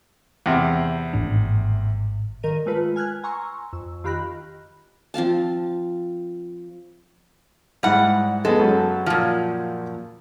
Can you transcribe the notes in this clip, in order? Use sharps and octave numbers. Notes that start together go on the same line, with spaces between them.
E2 C3
G#1 A2 D4
G2 D#3 A#4 D#7
G#3 A3 F4 B4
G#5 F6 F#6 G#6
G#5 A#5 C6 C#6 E6
F2 E6
D#3 F4 G4 B5 F#6 A#6
F3 C4 F5 A5
G#2 G3 E4 F#5
G#3 B3 A4
F#2 C#3 F#3
A#2 F3